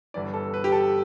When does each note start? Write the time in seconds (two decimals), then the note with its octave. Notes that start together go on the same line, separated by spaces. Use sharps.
0.14 G1 G2 E3 D5
0.34 A4
0.54 B4
0.64 G4
0.72 A4